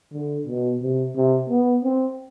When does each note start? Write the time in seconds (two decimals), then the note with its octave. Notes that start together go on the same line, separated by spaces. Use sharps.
0.13 D3
0.47 B2
0.82 C3
1.16 C3
1.50 B3
1.84 C4